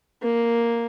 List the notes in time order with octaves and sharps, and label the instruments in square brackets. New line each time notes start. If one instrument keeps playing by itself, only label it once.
[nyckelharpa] A#3